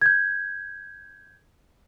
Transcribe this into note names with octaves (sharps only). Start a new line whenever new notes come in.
G6 G#6